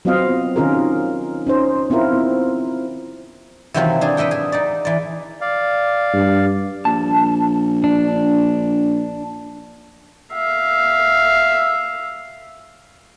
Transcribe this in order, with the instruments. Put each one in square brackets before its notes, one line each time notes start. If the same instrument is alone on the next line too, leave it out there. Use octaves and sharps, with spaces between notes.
[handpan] F#3 B3 C4 F4 D#5 F5
D#3 C#4 D#4 F4 G#4 A#4
C#4 D#4 C5
B3 C4 E4 F4 A#4
[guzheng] C3 D#3 E3 F#3 C4 F4
D4 G#4
B4 D#5 E5 F#5 G5
G#4
D#4 D5
E3 D5
[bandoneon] D5 F5
[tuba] G2
[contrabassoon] A#1 [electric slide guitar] A5
[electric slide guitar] D4
[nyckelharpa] E5 F5